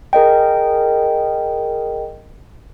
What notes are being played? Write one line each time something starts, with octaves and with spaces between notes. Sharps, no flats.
G#4 A#4 D#5 G5